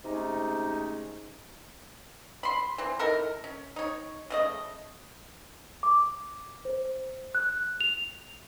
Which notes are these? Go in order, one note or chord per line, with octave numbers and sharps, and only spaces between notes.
C3 G#3 A3 C#4 D#4
B5 C6
E3 C4
D#4 E4 A4 A#4
C#4
D#4 C#5
C#3 A3 D#5
D6
C5
F#6
F7